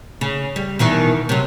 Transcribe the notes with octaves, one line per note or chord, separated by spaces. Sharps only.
C#3
G3
B2 D#3 E3
C3 F#3